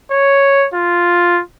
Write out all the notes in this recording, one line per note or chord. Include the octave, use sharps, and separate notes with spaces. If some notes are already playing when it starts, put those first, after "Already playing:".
C#5
F4